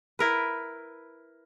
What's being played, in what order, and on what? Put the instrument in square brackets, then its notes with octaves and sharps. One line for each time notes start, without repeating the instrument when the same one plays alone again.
[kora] E4 A#4 B4